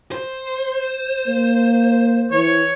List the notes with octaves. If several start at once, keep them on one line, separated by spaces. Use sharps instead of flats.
C5
A#3
E3 C#5